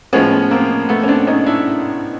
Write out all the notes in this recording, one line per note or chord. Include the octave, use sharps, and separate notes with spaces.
A2 F3 G#3 B3 C#4
A#3 C4
A3 B3
C#4
C4 D4
C#4 D#4
D4 E4